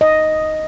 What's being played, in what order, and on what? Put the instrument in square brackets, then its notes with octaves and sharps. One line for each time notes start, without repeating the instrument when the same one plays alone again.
[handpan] D#5